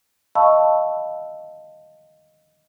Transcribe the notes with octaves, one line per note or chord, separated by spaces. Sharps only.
D#5 F5 A5 B5 C#6 E6